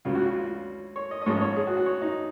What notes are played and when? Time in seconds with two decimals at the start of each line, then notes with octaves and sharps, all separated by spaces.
0.05 C#2 C#3 F#3 C#4 F4
0.15 F#4
0.25 F#4
0.36 F4
0.96 C#5
1.11 D#5
1.22 D#5
1.26 G#1 G#2 F3 G#3 C#4 C#5
1.41 C#5
1.56 G#4
1.67 F#4
1.77 F#4
1.86 C#5
2.02 D#4